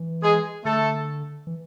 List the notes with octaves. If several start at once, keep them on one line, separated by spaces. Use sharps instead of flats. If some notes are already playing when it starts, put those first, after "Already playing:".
Already playing: E3
G#3 G#4
D3 A3 A4
E3